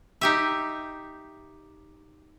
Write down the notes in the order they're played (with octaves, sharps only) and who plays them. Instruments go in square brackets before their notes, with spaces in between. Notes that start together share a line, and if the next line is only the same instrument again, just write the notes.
[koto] D#4 G4 E5